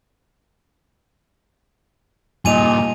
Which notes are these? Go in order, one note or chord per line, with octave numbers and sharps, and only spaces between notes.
G2 A#2 G3 A#3 D#5 G#5 D#7 F7